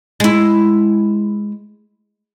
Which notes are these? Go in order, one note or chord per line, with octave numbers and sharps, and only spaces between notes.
G#3 E4